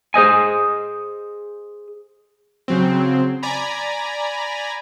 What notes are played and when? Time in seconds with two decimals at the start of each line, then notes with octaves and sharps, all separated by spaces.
0.14 G#4 C5 D#5 G#5
2.68 C#3 F#3 C4
3.43 D5 G#5 A#5 B5